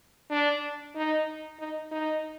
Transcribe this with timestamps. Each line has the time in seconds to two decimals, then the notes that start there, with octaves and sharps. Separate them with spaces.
0.30 D4
0.95 D#4
1.59 D#4
1.92 D#4